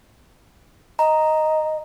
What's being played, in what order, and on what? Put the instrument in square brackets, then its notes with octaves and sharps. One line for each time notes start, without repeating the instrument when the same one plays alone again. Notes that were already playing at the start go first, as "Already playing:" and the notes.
[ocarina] D#5 [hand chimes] A#5